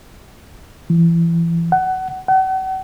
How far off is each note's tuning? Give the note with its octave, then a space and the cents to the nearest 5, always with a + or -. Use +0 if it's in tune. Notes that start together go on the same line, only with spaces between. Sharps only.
E3 +30
F#5 +20
F#5 +40